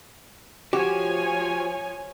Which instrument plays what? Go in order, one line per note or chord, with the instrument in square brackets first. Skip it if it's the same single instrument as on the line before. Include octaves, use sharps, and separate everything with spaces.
[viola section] F3 C#5 G#5 [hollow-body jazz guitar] F#4 G4